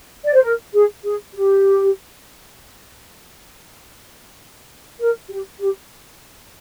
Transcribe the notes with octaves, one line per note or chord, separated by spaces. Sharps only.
D5
C5
A#4
G#4
G#4
G4
A#4
G4
G4